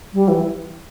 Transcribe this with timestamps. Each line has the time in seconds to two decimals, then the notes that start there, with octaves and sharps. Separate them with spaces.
0.14 G3
0.28 E3